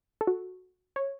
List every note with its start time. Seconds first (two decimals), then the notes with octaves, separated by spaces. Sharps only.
0.21 A4
0.27 F#4
0.96 C#5